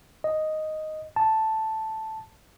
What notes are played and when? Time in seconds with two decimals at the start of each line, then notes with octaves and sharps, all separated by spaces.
0.24 D#5
1.16 A5